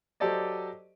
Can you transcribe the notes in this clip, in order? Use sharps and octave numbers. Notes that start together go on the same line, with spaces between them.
F#3 G4 A4 C5 D5 D#5